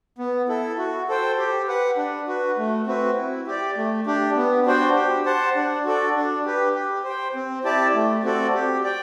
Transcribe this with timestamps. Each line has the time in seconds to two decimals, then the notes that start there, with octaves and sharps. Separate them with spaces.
0.18 B3
0.48 E4 A4
0.78 F#4
1.08 A4 C5 G5
1.38 G4
1.68 B4 F#5
1.97 D4
2.27 F#4 B4
2.58 A3
2.87 C4 F#4 B4
3.17 E4
3.47 G4 D5
3.76 A3
4.06 D4 G4
4.36 B3
4.66 D4 F#4 C5 G5
4.96 G4
5.26 C5 F#5 A5
5.55 D4
5.85 F#4 A4 D5
6.15 D4
6.45 G4 B4
6.75 G4
7.04 C5 G5
7.35 C4
7.64 E4 G4 D5 A5
7.94 A3
8.24 C4 F#4 A4 D5
8.54 G4
8.84 D5 G5